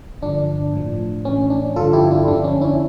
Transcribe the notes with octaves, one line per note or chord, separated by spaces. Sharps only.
G2 D3 F3 D4
A2 F3
A2 E3 C#4
D4
G2 D3 F3 F4 A4
E4 G4
D4 F4
F2 D3 F3 D4
C#4
C#4 E4